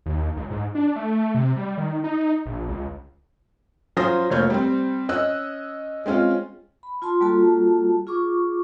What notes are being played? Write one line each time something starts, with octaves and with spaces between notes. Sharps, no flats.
D#2
C#2
G#2
D4
A3
C3
G3
D#3
D#4
A#1
C#2
F#3 C#4 F4 C5 D#6 A#6
F1 A#3 C#5 F6 G6
G3 C4
C#4 D#5 E6 F#6
G#3 C4 C#4 F4
B5
F4 A5 C6
G3 A#3 F4 F#4 A4 A5
F4 G#4 C#6 D6